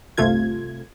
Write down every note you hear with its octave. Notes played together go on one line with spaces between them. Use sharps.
G1 C2 C3 A3 F4 G#6